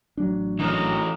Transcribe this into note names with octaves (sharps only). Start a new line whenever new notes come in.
A1 F#3 D4
E3 C#4 D#4 F#4 A#4